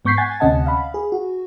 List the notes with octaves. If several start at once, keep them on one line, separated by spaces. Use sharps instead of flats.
G#2 B3 C#6 G6 B6 C7
F#5 G#5 G#6 A6
D2 C3 C#4 D#5 F#5 A5
F5 B5
G#4
F#4